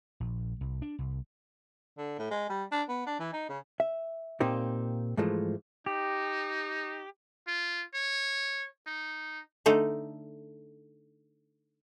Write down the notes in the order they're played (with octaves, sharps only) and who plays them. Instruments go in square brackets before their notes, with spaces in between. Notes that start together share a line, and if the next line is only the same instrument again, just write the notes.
[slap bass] A#1
C2
D4
C2
[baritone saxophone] D3
A2
G#3
G3
D4
B3
D4
E3
D#4
C#3
[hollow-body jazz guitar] E5
A#2 A#3 C4 D#4 G4
G#2 E3 F3 G#3 A3
[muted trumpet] D#4 [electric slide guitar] G4
[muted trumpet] F4
C#5
D#4
[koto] D3 A3 D#4